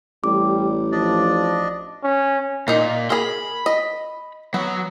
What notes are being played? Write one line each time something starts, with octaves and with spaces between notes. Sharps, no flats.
A1 G3 D6
F3 D4 D5 D#5
C#4
A#2 D#4 A#4
G#4 A#4 B5 C6
D#5
F#3 B3